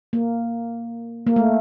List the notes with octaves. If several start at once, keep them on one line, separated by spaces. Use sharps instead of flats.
A#3
A#3
A3